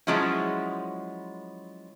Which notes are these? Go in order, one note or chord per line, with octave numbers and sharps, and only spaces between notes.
F3 F#3 G#3 C#4 E4